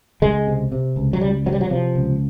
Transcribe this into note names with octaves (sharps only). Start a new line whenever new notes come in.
C#2 G#3
C3
C3
C#2
F#3
C#2 G3
C3 F#3
G3
F#3
C3 F3
C#2